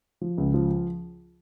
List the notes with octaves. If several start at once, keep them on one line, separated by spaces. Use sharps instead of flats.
F3
C#2
F3